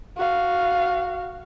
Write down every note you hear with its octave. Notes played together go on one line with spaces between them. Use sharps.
F#4 F5